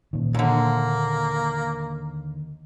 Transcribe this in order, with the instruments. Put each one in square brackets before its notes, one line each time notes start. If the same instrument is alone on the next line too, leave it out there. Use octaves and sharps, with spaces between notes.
[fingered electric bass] A#2 D#3
[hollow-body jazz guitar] D#2 D3 [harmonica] A#3